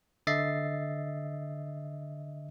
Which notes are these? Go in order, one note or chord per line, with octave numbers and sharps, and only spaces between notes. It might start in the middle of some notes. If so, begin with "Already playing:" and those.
D3 D#5 E5 A6 C7